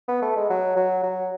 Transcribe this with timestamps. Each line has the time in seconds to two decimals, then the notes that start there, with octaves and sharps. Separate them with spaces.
0.08 B3
0.22 A3
0.36 G#3
0.50 F#3
0.76 F#3
1.03 F#3